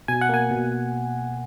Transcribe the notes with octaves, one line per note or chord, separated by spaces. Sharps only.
B2 G#5
F#5
A#3 G#5
B2